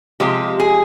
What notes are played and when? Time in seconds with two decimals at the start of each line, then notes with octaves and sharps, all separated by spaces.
0.20 C3 F3 G#3 G4
0.60 G#4